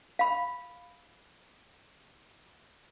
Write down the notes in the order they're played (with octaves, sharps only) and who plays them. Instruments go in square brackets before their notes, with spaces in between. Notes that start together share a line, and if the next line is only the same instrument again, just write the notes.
[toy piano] F5 B5